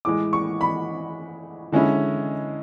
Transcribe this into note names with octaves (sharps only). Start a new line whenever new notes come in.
A2 E3 G#3 D6
C#6
B5
D3 G#3 C#4 E4